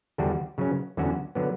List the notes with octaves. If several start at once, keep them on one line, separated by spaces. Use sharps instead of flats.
E2 D3 G3 D4 F#4
C#3 F#3 C#4
E2 D3 F#3 C#4 F#4
D3 F#3 B3